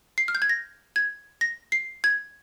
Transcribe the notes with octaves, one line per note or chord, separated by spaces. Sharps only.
C7
F6
G6
G#6
A#6
G#6
A#6
C7
G#6